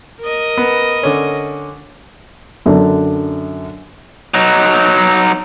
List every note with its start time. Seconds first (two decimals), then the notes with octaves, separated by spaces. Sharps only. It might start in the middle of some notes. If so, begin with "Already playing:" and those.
0.21 A#4 D#5
0.58 B3
1.03 D3 C#4
2.66 F#2 D3 D4
4.34 F#3 D#4